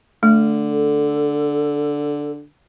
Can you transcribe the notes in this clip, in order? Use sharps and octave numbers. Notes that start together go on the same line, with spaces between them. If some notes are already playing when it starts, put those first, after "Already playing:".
D3 A3
A4